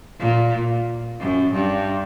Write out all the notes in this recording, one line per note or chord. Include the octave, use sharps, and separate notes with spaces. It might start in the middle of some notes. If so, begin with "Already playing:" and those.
A#2
F#2
G2